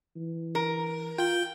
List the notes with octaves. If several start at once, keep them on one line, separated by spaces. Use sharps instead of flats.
E3
A#4
F4 G5 G6